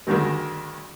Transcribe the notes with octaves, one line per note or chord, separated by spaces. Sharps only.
D2 G2 D3 D#3 G#3